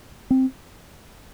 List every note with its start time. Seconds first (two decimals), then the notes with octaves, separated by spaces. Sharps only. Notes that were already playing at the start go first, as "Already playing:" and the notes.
0.31 C4